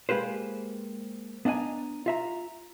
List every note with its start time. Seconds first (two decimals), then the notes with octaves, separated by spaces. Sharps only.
0.09 G#3 A#3 G4 B4 C5
1.45 B3 D4 D#5 E5 G#5 A#5
2.06 F4 E5 A#5